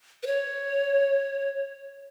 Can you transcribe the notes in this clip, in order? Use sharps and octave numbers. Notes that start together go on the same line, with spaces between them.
B4
C#5